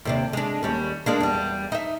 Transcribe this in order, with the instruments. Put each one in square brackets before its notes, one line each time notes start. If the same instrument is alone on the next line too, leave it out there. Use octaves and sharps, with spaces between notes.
[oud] D#2 C3 D4
G#3 D4
D#2 G3 C#4
G#3 A#3 D4
E2 G3
D#4 E5